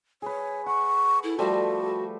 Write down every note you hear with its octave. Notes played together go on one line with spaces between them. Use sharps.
G#4 B4 C#5
F#5 C#6
E4 A4
F3 G3 A3 F#4